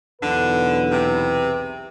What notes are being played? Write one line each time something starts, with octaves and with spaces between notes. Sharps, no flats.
B1 E2 D3 B4
C3